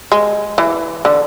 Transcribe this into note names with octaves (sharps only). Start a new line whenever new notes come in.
G#3
E3
D3